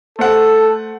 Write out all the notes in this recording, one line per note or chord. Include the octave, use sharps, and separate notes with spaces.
A3 A4 C5 F#5